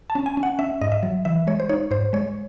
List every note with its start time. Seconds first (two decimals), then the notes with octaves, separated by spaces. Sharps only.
0.10 A5
0.15 C#4
0.26 G#5
0.37 C#4
0.43 F#5
0.59 C#4 E5
0.81 G#2 D#5
0.92 E5
1.03 F#3
1.25 E3 E5
1.47 G#3 C#5
1.60 C5
1.69 D#4 C#5
1.91 G#2 C5
2.13 G#3 C#5